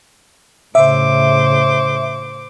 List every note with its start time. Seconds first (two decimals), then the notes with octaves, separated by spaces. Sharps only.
0.75 A2 C#3 C5 E5 D6